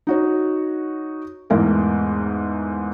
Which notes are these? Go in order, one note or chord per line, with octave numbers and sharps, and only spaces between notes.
D#4 F#4 C#5
E2 G#2 E3 A3 A#4